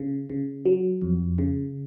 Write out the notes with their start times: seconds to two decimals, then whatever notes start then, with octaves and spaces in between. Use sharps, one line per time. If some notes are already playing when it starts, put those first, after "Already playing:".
Already playing: C#3
0.30 C#3
0.65 F#3
1.02 F2
1.38 C#3